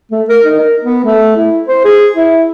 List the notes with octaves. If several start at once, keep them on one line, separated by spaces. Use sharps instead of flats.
A3
A#4
D#4
A#4
B3
A3
E4
C5
G#4
E4